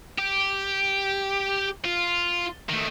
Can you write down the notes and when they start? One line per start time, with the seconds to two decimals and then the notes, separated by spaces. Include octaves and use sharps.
0.18 G4
1.85 F4
2.69 D#3 A3